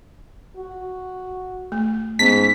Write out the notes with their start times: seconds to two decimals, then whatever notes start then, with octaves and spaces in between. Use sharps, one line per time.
0.57 F#4
1.72 A3
2.19 G#2 B3 C#4 B6